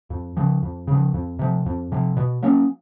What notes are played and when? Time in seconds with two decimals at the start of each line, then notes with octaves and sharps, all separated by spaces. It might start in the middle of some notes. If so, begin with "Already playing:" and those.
0.10 F2
0.37 C#3 F3
0.63 F2
0.87 C#3 F3
1.14 F2
1.39 C3 F3
1.66 F2
1.92 C3 F3
2.17 B2
2.43 F#3 A#3 C#4